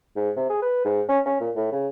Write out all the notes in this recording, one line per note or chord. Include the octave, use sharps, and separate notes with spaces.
G#2
C3
G#4
B4
G#2
C#4
C#4
A#2
A2
C#3